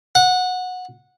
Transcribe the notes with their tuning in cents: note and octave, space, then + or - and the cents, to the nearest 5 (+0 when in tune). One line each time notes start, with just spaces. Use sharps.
F#5 -15